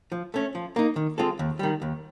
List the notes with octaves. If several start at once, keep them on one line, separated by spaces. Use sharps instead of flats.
F3
A3 C#4
F3
A#3 D#4
D#3
G#3 C4 F4 A4
D#2
D#3 G3
D#2